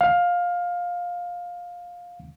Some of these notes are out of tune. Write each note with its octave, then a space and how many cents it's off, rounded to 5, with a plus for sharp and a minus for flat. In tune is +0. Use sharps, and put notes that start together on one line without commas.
F5 +15